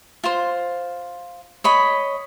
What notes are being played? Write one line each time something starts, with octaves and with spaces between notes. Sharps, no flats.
F4 C5
C#5 D#5 B5